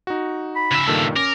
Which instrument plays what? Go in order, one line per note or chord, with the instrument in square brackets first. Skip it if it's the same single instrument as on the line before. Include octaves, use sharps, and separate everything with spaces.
[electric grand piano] D#4 F#4
[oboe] B5
[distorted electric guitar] C#3 E5
[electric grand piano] G2 A#2 D#3 [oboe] A4
[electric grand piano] C#4 [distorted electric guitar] A#4 [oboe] D6